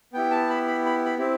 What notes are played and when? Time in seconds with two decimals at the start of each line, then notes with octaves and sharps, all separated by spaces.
0.13 B3 E4 G4 G5
0.31 A5
0.49 B5
0.67 B5
0.86 B5
1.05 B5
1.18 C4 E4 G4